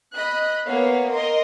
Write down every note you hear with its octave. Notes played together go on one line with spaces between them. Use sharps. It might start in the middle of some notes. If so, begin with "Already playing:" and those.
D#5 B5 F#6
A#3 B3 C#5 F5
A#4 D#5 C6